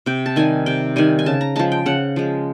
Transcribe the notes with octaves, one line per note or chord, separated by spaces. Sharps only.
C3 G5
A5
D#3 G3 G#5
C3 G5
D#3 G3 G#5
G#5
C#3 A5
A#5
F3 G#3 A5
G5
C#3 F#5
F3 G#3